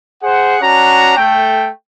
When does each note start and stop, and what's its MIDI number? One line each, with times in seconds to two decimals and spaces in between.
0.23 0.57 68
0.23 0.57 72
0.23 0.57 78
0.61 1.16 61
0.61 1.16 62
0.61 1.16 66
0.61 1.16 82
1.17 1.69 57
1.17 1.69 79